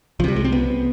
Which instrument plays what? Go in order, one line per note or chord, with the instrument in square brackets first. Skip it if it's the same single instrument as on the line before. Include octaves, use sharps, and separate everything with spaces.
[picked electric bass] C2 F3
C3 G3
G#3
C4
B3